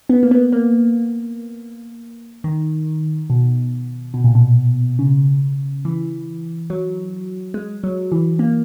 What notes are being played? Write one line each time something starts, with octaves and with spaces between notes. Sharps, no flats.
B3
A#3
B3
A#3
D#3
B2
B2
A#2
B2
C#3
E3
F#3
G#3
F#3
E3
A#3